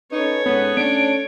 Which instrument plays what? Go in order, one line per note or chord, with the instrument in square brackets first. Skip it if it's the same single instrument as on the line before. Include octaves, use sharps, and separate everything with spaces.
[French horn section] C#4 B4 [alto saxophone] D#4 [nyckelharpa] A4 C#5
[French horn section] G#2 [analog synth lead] B3 [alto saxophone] C#4
[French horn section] A3 C#4 [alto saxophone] D4 [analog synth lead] D7